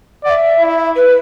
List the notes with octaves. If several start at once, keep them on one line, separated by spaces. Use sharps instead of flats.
D5 F#5
E5
E4
B4